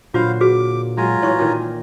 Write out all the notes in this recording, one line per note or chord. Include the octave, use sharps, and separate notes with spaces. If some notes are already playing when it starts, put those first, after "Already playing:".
A#2 D3 F#3 F4 C5 F5 B5
F#4 G#4 B4 D6
F#3 G#3 F4 G#5 A#5
A2 E3 B4 C#5 C#6
A#2 D#3 E3